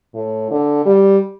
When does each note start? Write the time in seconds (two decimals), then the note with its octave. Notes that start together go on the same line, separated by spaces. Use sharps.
0.14 A2
0.51 D3
0.85 G3